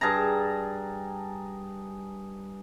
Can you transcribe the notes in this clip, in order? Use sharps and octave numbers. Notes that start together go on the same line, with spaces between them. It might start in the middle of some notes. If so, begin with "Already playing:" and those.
G2 G#4 A5 A#5